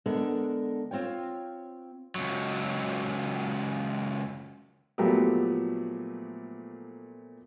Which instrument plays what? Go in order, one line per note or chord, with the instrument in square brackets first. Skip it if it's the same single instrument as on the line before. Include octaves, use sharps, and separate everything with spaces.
[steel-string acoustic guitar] D3 G#3 B3 D4 A4 A#4
C4 F4 C#5 G5
[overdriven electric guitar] C#2 F#3
[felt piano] A#2 F3 F#3 A3 B3 G4